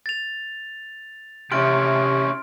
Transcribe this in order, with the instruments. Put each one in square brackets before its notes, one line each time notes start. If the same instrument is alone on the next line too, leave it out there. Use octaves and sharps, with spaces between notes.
[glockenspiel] A6 F7
[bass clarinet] C3 [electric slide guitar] C#4 E4 G4 [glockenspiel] C6 F6 D7